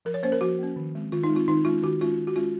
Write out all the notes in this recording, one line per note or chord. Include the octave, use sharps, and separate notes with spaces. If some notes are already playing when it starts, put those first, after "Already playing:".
F3 A#4
C#5
A#3 C#4 C5
A#4
F3 F#4
A#3 C#4
D#3
G#3 C4
D#3 F4
D#4
G#3
C4 F4
D#3 D#4
G#3 C#4 F4
D#3 F#4
G#3 C#4 F4
D#3
F#4
G#3 C#4 F4